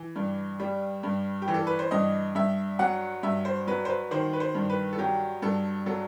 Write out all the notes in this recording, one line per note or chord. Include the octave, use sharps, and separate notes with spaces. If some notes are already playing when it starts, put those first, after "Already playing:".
Already playing: E3
G2
G3
G2
G4
E3
A4
B4
C5
G2 D#5
G2 E5
F#3 F#5
G2 E5
C5
F#3 B4
C5
B4
D#3 C5
B4
C5
G2
B4
A4
F#3 G4
G2 A4
F#3 A4